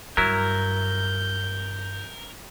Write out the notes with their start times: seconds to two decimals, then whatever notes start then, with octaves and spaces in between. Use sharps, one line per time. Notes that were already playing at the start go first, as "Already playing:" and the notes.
0.17 G2 F#3 E4 A#4 G6